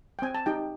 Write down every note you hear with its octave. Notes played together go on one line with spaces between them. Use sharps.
G5
C4 G#5
A5
D#4 G4 G5